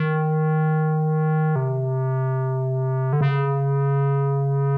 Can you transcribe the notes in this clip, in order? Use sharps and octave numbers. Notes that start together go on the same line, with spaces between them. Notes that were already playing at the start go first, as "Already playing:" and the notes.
Already playing: D#3
C3
D3
C#3